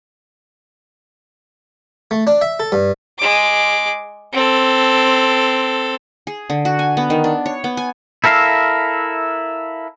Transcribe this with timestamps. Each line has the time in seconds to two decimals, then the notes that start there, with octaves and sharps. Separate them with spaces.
2.11 A3
2.27 D4
2.41 E5
2.60 A4
2.72 G2
3.18 G#3 D6
4.33 C4 A4
6.27 G#4
6.50 D3
6.65 F#4
6.79 G#5
6.97 B3
7.10 D#3
7.24 D4
7.46 C#5
7.64 B3
7.77 G#5
8.24 E4 A4 A#4 E5 F5